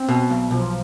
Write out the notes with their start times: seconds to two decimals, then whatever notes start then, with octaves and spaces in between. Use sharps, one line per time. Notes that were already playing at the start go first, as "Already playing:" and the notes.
Already playing: C4
0.09 B2
0.30 B1
0.51 B1 F3